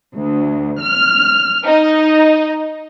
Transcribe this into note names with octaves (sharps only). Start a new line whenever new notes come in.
D2
F6
D#4